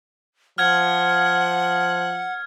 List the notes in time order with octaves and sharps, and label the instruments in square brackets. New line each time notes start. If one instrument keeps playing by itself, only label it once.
[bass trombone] F3 [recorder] F#5 [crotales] F6 G#6